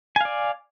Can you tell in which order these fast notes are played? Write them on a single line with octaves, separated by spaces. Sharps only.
G#5 F5 D5